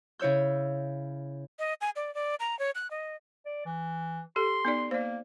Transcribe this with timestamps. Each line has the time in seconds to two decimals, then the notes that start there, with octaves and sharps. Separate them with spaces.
0.19 C#3 E4 C#5 E6 G6
1.59 D#5
1.81 G#5
1.96 D5
2.15 D5
2.40 A#5
2.59 C#5
2.75 F#6
2.91 D#5
3.46 D5
3.66 E3
4.36 G4 A4 C6
4.65 B3 D#4 D5
4.91 A#3 C5 D5